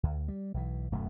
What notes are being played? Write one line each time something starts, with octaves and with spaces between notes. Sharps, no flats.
D2
G3
B1 E3
D1 F#2 B2 A3